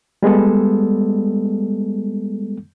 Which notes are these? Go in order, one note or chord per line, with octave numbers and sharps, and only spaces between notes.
G3 G#3 B3 A4